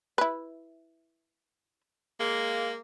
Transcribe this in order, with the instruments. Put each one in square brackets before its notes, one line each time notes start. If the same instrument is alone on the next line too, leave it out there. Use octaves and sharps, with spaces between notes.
[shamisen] E4 B4
[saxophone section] G#3 A#3